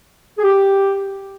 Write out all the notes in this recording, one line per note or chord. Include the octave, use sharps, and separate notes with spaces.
G#4
G4